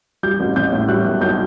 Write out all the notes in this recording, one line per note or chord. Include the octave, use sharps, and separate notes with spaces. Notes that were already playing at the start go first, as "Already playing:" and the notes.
G3 G6
A1
A1 G6
A2
G3 F#6
B1
B1 G6